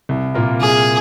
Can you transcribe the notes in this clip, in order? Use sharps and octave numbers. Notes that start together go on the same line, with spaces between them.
C2
A#2 A#3 F4 A#4
C2 G#4